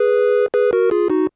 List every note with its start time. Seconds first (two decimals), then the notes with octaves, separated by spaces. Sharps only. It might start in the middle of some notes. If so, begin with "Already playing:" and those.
Already playing: G#4 B4
0.54 G#4 B4
0.73 F#4 A#4
0.91 F4 G#4
1.10 D#4 F#4